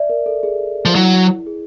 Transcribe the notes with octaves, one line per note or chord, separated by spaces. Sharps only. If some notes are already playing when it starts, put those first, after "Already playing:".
Already playing: D5 E5
A#4
A4
G#4
F3
F#3 E4
G#4